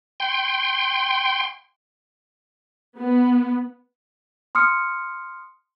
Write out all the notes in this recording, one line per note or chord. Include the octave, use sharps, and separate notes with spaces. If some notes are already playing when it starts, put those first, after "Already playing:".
G5 C6
B3
C6 D#6 F6 C#7